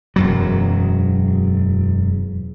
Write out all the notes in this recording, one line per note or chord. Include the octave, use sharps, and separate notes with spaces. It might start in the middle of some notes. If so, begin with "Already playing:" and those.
E1 F#2 F#3